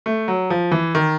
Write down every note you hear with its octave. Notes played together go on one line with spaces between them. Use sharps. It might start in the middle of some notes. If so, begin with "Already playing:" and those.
A3
F#3
F3
E3
D#3